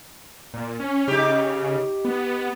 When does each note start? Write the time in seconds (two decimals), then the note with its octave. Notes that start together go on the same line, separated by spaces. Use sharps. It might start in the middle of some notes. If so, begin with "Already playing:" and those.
0.54 A#2
0.80 C#4
1.08 C#3 D#4 G4
2.05 B3